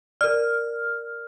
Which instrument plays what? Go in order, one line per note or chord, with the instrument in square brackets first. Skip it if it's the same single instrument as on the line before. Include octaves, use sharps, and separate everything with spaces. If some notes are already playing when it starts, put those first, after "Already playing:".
[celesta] A#4 D5 [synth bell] F6